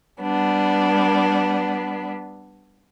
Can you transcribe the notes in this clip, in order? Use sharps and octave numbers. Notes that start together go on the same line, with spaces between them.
G3 B3 D4